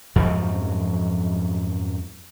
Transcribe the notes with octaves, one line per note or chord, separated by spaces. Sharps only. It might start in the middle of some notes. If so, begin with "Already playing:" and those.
F2 G#2 F3 F#3